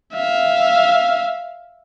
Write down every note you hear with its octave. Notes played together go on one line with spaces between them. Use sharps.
E5 F5